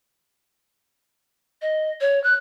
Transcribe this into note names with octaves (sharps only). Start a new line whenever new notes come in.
D#5
C#5
F#6